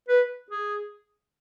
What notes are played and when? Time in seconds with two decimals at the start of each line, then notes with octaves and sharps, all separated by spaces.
0.09 B4
0.51 G#4